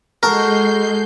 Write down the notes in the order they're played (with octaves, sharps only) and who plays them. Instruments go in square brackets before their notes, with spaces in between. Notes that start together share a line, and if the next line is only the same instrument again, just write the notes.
[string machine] G#3 G6 C7 [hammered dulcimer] F#4 A4 [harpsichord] A#4